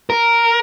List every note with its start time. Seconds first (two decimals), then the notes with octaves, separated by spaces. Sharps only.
0.10 A#4